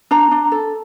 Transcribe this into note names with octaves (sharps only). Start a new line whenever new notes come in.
D4 A#5
D4
A4